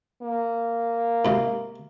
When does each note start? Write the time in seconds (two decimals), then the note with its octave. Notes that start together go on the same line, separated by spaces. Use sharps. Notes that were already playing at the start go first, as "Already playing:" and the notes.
0.22 A#3
1.25 G#2 C3